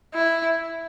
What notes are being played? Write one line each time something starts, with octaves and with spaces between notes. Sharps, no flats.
E4